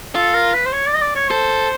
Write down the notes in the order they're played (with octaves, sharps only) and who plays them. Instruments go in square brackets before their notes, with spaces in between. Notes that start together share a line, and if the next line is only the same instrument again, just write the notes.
[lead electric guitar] F4 [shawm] A4
[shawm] A#4
B4
C5
C#5
D5
D#5
D5
C#5
[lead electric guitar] A4 [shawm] C5